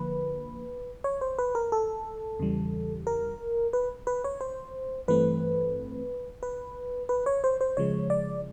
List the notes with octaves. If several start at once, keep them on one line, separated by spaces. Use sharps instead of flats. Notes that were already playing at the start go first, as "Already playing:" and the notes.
Already playing: D3 F3 A#3 B4
C#5
C5
B4
A#4
A4
E2 C#3 E3 G3
A#4
B4
B4
C#5
C5
G2 E3 A3 C4 B4
B4
B4
C#5
C5
C5
C#3 F3 G#3 C#5
D5